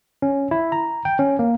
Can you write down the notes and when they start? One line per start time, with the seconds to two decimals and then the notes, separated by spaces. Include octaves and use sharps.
0.22 C#4
0.51 E4
0.72 A#5
1.05 G5
1.19 C#4
1.39 A#3